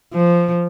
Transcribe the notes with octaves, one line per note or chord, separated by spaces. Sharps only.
F3